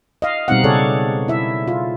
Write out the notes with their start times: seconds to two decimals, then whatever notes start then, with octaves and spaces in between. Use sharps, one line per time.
0.22 D#5 F5
0.48 B2 G3 C4 D#4 F5 F#5
0.64 C#3 G#4 A4 C#5 D5
1.28 E4 E5
1.68 F4